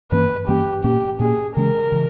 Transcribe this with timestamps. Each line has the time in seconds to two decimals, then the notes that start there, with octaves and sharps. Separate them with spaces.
0.11 G2 E3 A#3 C#4 B4
0.48 G2 E3 A#3 C#4 G4
0.84 A#2 A#3 C#4 G4
1.19 A#2 A#3 C#4 G#4
1.56 C#3 E3 G#3 C#4 A#4
1.92 C#3 E3